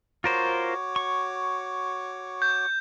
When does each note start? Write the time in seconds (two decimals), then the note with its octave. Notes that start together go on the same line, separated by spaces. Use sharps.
0.24 F4 F#4 A#4 C5 C#5 D6
0.96 C#6
2.42 G6